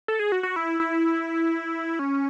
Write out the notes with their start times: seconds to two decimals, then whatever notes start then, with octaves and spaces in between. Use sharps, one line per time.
0.08 A4
0.19 G#4
0.32 F#4
0.43 F#4
0.56 E4
0.80 E4
1.99 C#4